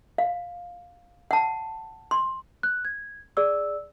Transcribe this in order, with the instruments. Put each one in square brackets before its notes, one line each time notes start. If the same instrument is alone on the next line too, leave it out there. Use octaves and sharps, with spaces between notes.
[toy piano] F5
F#5 A5
C6
[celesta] F#6
G#6
G#4 D5 E6